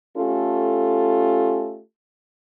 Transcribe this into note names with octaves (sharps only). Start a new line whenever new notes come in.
A3 C#4 F4 G4 A4